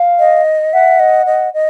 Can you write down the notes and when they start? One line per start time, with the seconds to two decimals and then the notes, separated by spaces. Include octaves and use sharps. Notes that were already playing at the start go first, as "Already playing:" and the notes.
Already playing: F5
0.19 D#5
0.73 E5 F#5
0.99 D#5
1.26 D#5
1.54 D#5